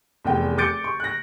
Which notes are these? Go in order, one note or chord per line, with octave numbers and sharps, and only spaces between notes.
F1 E2 G5
D6 G6 A6 C#7 D7
C#6
F#6 A#6